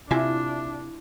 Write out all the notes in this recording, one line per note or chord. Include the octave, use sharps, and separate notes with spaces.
C3 D4 E4 F4 G#5